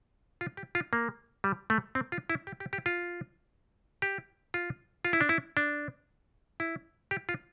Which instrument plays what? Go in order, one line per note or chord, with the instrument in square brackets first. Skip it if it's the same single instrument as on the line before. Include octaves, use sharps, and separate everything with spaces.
[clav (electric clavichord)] F4
G4
F4
A#3
G3
A3
C4
F4
E4
G4
G4
G4
F4
G4
F4
F4
E4
D4
E4
D4
E4
G4
F4